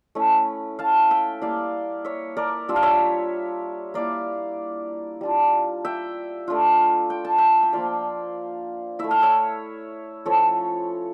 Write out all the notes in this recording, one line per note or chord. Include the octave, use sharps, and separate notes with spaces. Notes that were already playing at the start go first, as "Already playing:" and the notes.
A3 C#4 E4
F5 A5
E5 G5
G3 A#3 E4 D5 F5
C#5 E5
A#4 D5
G3 D4 F4 E5
F5
C#5 E5
A#3 E4 D5 F5
G3 D4 F4
E5 G5
A3 D4 F4
G5
A5
E5 G5
G5
F3 A#3 D4 F4 D5 F5
A3 E4 E5
F5
C#5 E5
F3 C#4 E4 A4 C#5